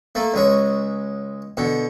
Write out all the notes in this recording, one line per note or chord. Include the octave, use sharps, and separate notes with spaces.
A3 A#3
C#2 G#3 C#5
B2 D3